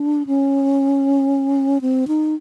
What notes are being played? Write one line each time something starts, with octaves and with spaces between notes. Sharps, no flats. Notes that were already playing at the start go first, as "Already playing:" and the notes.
Already playing: D4
C#4
C4
D#4